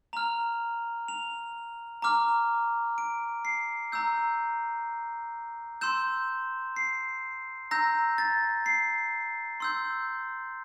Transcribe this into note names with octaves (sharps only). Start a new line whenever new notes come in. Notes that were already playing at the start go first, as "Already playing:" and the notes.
A#5 F6 F7
F7
A#5 D6 F6
D7
C7
A#5 E6 G6
C6 E6 G6 E7
C7
A#5 E6 G6 A#6
A6
C7
C6 E6 G6